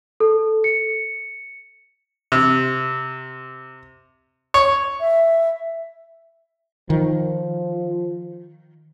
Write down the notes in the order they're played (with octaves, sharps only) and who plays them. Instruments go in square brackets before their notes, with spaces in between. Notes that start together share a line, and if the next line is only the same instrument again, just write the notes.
[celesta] A4
C#7
[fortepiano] C3
C#5
[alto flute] E5
[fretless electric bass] D#3 [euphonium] F3